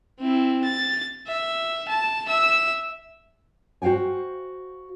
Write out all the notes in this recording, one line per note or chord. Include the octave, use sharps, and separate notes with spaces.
C4 E4
A6
E5
A5
E5 E6
F#4 C5 F5 G5 G#5